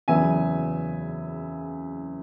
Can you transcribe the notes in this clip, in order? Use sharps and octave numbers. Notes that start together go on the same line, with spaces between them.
F#1 E2 C#3 F#3 B3 E5 G#5